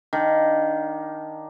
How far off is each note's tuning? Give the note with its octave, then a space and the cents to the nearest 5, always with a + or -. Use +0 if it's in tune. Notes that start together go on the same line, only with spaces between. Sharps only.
D#3 +5 D4 +0 F5 +30